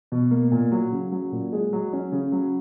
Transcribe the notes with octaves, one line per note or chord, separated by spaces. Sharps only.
B2
A#3
A#2
F#3
C#3
F#3
A#2
G#3
F#3
C#4
C#3
F#3